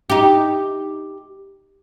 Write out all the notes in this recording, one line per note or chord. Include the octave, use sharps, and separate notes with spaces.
D#4 G4